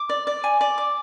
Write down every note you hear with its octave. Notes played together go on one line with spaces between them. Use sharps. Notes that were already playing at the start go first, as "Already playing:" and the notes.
Already playing: D6
D5
D5
G#5
D5
D6